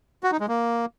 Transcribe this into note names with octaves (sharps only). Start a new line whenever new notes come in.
F#4
D#4
G#3
A#3